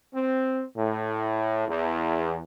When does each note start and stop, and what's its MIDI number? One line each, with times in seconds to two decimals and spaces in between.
0.15 0.64 60
0.76 1.65 45
1.68 2.42 40